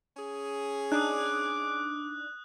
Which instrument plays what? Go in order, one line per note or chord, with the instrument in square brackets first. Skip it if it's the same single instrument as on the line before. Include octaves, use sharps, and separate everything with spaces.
[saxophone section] C#4 G#4
[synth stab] D4 D#4 [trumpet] D6 [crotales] D#6 F#6